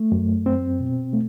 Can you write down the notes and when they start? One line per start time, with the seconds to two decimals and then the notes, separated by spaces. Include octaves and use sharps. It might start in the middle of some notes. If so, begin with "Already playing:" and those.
Already playing: A3
0.12 F#2
0.46 C4
0.80 B2
1.13 A3